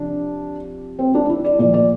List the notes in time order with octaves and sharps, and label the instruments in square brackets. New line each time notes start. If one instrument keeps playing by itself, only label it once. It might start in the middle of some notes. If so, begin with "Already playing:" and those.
Already playing: [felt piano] C3 F3 D4
C4
D4
E4
D5
A#2 F3 D5
D5